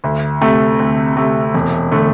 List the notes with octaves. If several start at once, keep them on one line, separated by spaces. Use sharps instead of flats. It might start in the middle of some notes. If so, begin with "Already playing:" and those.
D2
C3 A3
D2
C3 A3
E1
D3 A3